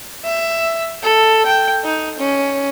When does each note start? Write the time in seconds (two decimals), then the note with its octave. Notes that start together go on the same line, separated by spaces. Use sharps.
0.25 E5
1.03 A4
1.46 G5
1.84 D#4
2.19 C#4